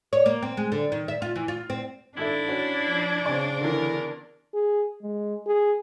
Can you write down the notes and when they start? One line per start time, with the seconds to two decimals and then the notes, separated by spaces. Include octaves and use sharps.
0.13 C#5
0.26 A#3
0.42 C4
0.57 G#3
0.72 D3
0.92 D#3
1.08 E5
1.22 F4
1.36 E3
1.48 F4
1.70 C4
2.17 G#1 D4 E4 A4 E5
2.48 C#4 F#4
2.85 F3
3.25 C#3 C4 C#4 D5 G#5 C#6
3.61 E2 D3 E3 A#4
4.54 G#4
5.03 G#3
5.47 G#4